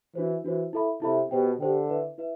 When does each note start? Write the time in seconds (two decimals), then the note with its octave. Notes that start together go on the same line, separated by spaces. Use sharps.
0.15 E3 D4 F#4 C5
0.44 E3 D4 F#4 C5
0.73 E4 A4 E5 B5
1.02 C3 E4 A4 E5 B5
1.31 B2 G4 C5 G5
1.60 D3 G4 C5 G5
1.90 E4 B4 E5
2.18 E4 B4 E5